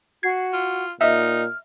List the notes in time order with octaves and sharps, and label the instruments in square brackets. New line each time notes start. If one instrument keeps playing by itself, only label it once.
[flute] F#4 [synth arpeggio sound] G#6 C7
[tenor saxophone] F4
[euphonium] A#2 [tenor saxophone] D#4 [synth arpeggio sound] D#5 E5 [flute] F6